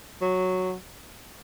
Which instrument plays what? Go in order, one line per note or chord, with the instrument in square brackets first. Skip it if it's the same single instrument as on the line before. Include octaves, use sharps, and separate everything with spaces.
[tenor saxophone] F#3